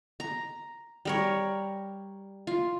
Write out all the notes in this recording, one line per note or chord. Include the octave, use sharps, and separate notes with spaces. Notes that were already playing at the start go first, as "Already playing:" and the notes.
A#5
G3 A#4 C#5
F4